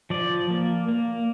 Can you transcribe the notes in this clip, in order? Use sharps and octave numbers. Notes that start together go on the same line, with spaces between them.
F3 D5
A#3
A#3